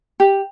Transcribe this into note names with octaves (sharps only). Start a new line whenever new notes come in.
G4